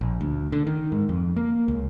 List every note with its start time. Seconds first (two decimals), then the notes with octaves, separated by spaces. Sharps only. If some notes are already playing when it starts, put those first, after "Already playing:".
0.01 A#1
0.21 D2
0.52 D3
0.67 D#3
0.92 G#2
1.09 F2
1.37 A#3
1.68 C#2